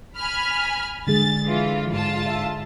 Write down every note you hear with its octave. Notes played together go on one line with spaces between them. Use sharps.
G#5 B5 F6
D3 G#3 G#4 A6
E3 F4
G#2 F4 A5
E5